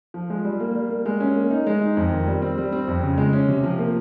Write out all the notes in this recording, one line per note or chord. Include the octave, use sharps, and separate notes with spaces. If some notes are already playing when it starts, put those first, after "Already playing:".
F3
G#3
G3
A#3
G3
A#3
G#3
C#4
A#3
D#4
G#3
D#4
F2
D#3
G3
C4
G3
C4
F2
C#3
G#3
C#4
C3
F3
A#3